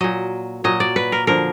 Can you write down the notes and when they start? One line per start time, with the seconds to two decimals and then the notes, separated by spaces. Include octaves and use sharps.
0.01 A#2 F#3 D#5
0.64 A#2 F#3 D#5
0.80 D5
0.96 B4
1.12 A#4
1.27 D3 F3 A#4